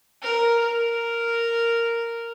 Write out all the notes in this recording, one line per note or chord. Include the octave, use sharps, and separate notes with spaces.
A#4
A#4